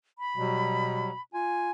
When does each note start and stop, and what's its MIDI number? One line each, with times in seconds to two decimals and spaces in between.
0.19 1.21 83
0.37 1.15 47
0.37 1.11 54
0.37 1.11 55
1.34 1.71 65
1.34 1.71 80